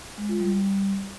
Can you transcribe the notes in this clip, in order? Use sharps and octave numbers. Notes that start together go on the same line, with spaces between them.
G#3
F4
G3